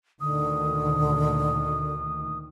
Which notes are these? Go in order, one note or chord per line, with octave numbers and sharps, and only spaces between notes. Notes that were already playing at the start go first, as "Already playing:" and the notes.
D2 A#2 D3 D#3 D#6